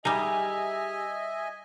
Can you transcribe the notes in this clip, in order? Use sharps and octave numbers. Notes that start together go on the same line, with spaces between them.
G3 D#4 G4 G#4 D#5 E5 G#5